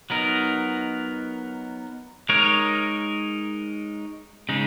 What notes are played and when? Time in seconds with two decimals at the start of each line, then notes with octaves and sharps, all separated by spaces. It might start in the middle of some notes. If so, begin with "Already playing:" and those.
0.10 F#3 B3 D#4 A#4
2.29 G#3 D#4 A#4 C#5
4.49 C#3 G#3 D#4